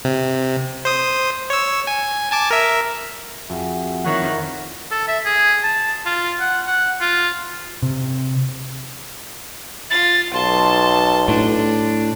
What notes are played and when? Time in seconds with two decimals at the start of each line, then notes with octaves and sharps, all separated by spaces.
0.05 C3
0.85 C5 D#6
1.50 C#5 E6
1.87 G#5
2.31 G#5 A5 D6
2.50 A#4 E5
3.50 F2 F#4 G#4 E5
4.05 E2 D#3 E4 C#5 E5 F#5
4.91 A4
5.08 E5
5.25 G#4
5.63 A5
6.06 F4
6.40 F#5
6.66 F#5
7.01 F4
7.83 C3
9.91 F4 A6
10.34 B1 A5 C6
11.28 A2 D4